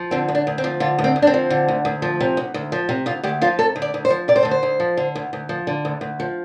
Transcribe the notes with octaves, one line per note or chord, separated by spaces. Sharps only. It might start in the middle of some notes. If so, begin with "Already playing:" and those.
Already playing: F3
D3 C4
D2
D4
D2
C4
F3
D3 F4
D2
C4
D2
D4
C4
F3
D3
D2
D2
F3
C3
D2
D2
F3
C3
D2 F4
D2 G4
F3 F4
C3 A4
D2
D5
D2
C5
F3
C3 D5
C5
D2 A4
C5
D2
F3
D3
D2
D2
F3
D3
D2
D2
F3